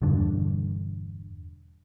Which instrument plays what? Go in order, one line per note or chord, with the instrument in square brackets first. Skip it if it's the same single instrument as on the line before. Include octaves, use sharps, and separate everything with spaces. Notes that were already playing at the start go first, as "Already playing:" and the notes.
[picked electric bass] E1 G2 D3